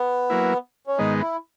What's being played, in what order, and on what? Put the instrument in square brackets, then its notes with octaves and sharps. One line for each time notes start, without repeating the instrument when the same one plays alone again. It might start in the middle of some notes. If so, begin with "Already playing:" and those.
Already playing: [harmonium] B3
[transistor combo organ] F#3 A#3 E4
[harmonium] C#4
[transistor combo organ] G#2 D#3 G#3 B3 [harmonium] D#4
[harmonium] E4